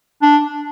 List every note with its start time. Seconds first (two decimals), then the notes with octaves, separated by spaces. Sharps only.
0.22 D4